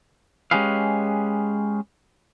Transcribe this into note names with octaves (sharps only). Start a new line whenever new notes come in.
G#3 C#4 G4 G#4 B4 F5